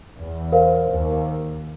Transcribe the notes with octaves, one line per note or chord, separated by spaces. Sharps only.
E2
A#4 C5 F5
D#2